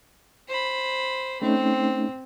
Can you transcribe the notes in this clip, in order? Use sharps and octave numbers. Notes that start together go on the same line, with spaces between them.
C5 B5
A3 C4 C#4 D#4